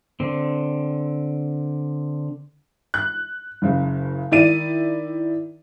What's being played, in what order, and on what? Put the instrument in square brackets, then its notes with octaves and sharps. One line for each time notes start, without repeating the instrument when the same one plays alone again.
[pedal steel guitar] D3 C4
[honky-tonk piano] F#6
F#1 C#3
D#3 E4 D5 D#7